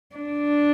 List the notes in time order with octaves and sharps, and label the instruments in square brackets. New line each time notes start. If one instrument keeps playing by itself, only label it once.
[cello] D4